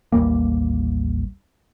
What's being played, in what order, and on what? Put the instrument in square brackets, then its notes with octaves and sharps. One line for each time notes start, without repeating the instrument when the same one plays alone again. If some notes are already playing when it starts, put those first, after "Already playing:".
[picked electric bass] A1 D#2 G3 A#3